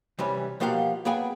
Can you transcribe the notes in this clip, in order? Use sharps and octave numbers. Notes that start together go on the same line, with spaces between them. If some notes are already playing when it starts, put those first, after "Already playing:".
C3 E3 G3 C#4
B2 F3 A#3 G4 F5 F#5
A#3 B3 G#4 G5 G#5